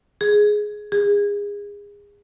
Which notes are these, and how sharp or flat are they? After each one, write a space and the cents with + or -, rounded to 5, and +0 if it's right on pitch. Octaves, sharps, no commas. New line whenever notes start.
G#4 +10
G#4 -30